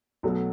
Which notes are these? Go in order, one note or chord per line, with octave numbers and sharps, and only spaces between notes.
B1 B2 F#3 A3